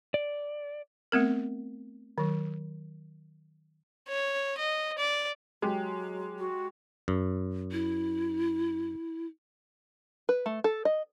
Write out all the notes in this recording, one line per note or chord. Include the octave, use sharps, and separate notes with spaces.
D5
A3 B3 C4 A#4
D#3 F#3
C#5
D#5
D5
F#3 G#3 G4
F#4
F#2
E4
B4
A3
A4
D#5